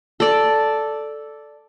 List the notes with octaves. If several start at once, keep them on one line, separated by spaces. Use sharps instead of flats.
A4 D5